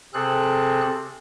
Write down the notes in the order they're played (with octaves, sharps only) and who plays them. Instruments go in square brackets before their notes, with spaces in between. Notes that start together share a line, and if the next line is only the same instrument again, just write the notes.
[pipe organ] C3 C4 G#4 A4 F#6